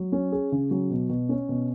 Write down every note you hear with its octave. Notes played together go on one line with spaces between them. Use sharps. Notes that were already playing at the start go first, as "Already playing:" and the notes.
Already playing: F#3
C#4
G#4
C#3
F#3
B2
B2
C#4
B2